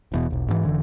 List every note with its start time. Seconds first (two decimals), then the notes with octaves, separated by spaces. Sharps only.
0.12 E1 E2 B2
0.30 E1 B1
0.48 G#2 C3 E3
0.65 F1 D3 E3